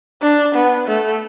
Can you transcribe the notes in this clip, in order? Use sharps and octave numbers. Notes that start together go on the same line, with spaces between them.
D4
B3
A3